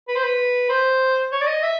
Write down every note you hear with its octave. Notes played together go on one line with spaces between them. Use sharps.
B4
C5
B4
C5
C#5
D5
D#5
E5